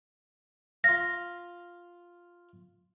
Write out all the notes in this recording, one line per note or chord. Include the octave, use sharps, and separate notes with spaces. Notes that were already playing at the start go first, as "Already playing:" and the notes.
F4 F5 A#6